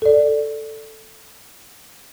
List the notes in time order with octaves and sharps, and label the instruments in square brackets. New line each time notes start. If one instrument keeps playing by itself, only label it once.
[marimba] A4 D5